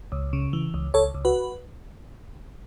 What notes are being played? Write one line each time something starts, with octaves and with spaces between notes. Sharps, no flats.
C#2
C#3
E3
C#2
C#2 A4 C#5
C#2
F#4 B4